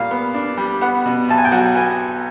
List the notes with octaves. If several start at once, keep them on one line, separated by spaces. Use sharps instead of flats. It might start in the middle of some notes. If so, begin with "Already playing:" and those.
Already playing: A#2 G3 F5
B3
D4
G3
B3 F#5
B2
B1 A5
G#5
G5
F#3 F#5
B3 G#5